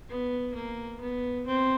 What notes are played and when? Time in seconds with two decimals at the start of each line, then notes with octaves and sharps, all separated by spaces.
0.09 B3
0.54 A#3
1.00 B3
1.46 C4